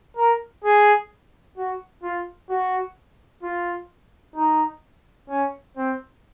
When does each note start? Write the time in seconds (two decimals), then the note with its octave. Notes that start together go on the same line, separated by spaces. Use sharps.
0.17 A#4
0.64 G#4
1.57 F#4
2.03 F4
2.49 F#4
3.43 F4
4.36 D#4
5.29 C#4
5.77 C4